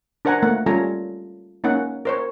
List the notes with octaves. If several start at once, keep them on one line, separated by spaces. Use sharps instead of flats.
D4 A#4 C5 F#5 G#5 A#5
A3 A#3 F#5
G3 C#4 F4 A4 G#5 A#5
A#3 C#4 D#4 F#5
A#4 C5 C#5